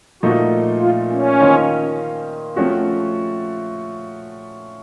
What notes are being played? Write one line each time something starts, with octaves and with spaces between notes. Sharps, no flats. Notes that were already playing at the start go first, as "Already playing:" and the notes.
A#2 F3 A3 D#4 F#4
F4
C#4
D#3 A#3 F4 C5 D#5
F3 A3 C4 C#4 F#4